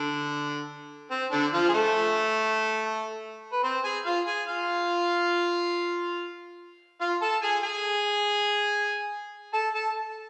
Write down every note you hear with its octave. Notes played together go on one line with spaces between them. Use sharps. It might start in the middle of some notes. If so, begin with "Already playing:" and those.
Already playing: D3 D4
C4
D3 D4
F3 F4
G#4
A3 A4
B4
C4 C5
G#4 G#5
F4 F5
G#4 G#5
F4 F5
F4 F5
A4 A5
G#4 G#5
G#4 G#5
A4 A5
A4 A5